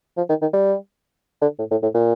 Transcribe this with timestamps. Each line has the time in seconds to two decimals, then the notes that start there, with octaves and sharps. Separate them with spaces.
0.17 F3
0.29 D#3
0.42 D#3
0.53 G3
1.42 D3
1.59 A2
1.71 A2
1.83 A2
1.94 A#2